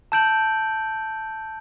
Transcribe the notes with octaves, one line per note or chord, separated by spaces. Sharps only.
A5 E6 G6 D7 F#7